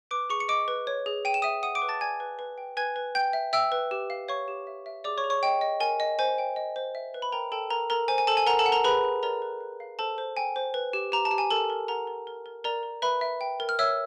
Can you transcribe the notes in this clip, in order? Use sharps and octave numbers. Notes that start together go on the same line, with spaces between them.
B4 D6 D7
G#4 C#6 C#7
C#7
D#5 D6 D7
B4
C#5
G#4
G5 D#7
E7
E5 D#6 D#7
F#5 D#6 D#7
D6 D7
B4
A5 A6
D5 G#5 G#6
B4
B4
G5
B4 G#5 G#6
B4
G5 G6
E5
E5 G5 E6
B4
G4
F5
C#5 F5 C#6
G4
E5
E5
G#4 D5 D6
C#5 C#6
G#4
C#5 C#6
D#5 G5
D#5
A#4 G#5
D#5
C5 G#5
G5
D#5
C5
E5
B4
B5
A#4 G5 A#5
A4 G5 A5
A4 A#4 A#5
A4 A#4 A#5
C5 G#5
G#5
A4 C5 A5
G#5
A#4 F#5 A#5
A4 A5
F#5
A#4 A#5
G#4 B4 B5
G#4
A#4 D5 A#5
B4
B4
F5
A4 C5 A5
C5
G5 G#5
C5
B4
G4
G4 A#5
A5
G4
G#5
A4 A#4 A5
A#4
A#4 F#5 A#5
A#4
A#4
A#4
A#4 D5 A#5
A#4
B4 E5 B5
E5
G5
A#4
F6
C#5 E5 E6